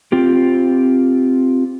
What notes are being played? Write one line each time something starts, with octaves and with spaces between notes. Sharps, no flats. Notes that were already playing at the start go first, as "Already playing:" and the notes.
C4 F4 G4